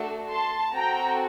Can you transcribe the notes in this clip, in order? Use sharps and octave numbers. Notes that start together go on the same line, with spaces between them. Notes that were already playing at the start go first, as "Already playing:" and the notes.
Already playing: A3 D4 F#4 A4
A5 C6
C4 F#4 A4 G5 A#5